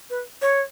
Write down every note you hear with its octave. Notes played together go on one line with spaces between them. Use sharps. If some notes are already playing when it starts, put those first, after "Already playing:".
B4
C#5